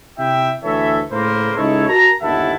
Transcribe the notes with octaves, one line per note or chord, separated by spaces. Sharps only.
C3 E4 E5 G5
D2 E3 A4 C#5 E5
A2 C#3 A#3 B4 C5
C#2 D#4 E4 A4 C#5
F#4 A#4 A5 A#5
G1 D#2 E4 E5 F#5 A5